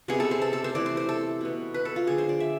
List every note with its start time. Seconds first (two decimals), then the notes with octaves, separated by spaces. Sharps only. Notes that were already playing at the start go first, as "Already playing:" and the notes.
0.08 C3 G#3 B3 G#4
0.20 A4
0.31 C5
0.42 A4
0.53 A4
0.64 C5
0.75 E3 A3 D5
0.86 C5
0.97 C5
1.09 A4
1.41 B2 B3
1.74 B4
1.85 A4
1.96 F4
2.07 D3 F3 G#3 G#4
2.18 C5
2.29 D5
2.40 E5